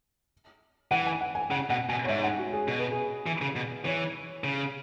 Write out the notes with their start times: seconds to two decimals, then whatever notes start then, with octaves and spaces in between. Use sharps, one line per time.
0.91 E3 F#5
1.07 G#5
1.21 F#5
1.35 G#5
1.51 C#3 F#5
1.70 B2 F#5
1.89 B2 G#5
2.04 C#5
2.09 G#2 E5
2.24 F#5
2.38 F#4
2.53 G#4
2.68 B2 G#4
2.79 B4
2.92 G#4
3.26 E3
3.41 C#3
3.56 B2
3.85 E3 C#5
4.44 C#3